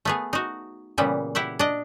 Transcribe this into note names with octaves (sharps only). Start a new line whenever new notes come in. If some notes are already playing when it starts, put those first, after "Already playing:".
A3 B3 G#4
D#4 F#4
A#2 C#3 E3 G3 B3
E4 G4 E5 F#5
D4 D#5